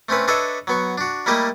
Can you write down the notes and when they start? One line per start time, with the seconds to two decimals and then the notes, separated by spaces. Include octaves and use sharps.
0.09 A3 C4 C#4 B4
0.28 D4 A4 B4 C#5 D#5 E5
0.67 F#3 B3 C#6
0.98 D4 F#4
1.26 G3 A3 A#3 E4 G4 D#5